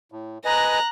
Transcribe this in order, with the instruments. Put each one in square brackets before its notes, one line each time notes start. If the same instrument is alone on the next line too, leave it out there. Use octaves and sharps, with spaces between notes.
[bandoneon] A2
[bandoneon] B4 D#5 G#5 [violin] A#5 F#6